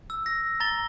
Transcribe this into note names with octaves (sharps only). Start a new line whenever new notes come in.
E6
A#6
A#5 A6 G7